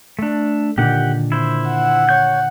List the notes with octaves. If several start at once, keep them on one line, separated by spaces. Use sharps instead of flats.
A3 D4
A#2 D3 D#3 G4 F#5
E4 C5
F#5
C#5 G6